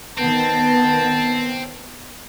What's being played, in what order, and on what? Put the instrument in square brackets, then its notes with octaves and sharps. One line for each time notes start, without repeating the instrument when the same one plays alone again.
[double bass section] D#3 B3 [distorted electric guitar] C4 [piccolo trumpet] A5